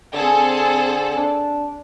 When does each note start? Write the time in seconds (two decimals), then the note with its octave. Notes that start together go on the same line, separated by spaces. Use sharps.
0.13 D3 C4 G#4 A4
1.17 D4